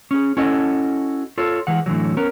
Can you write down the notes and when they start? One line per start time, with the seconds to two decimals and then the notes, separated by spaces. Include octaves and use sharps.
0.11 C#4 G#4
0.37 C#4 E4 F#4 A4 D#5
1.38 F4 A4 C#5
1.67 E3 G#3 F#5
1.86 A2 D3 E3 F#3
2.17 B3 C#4 A#4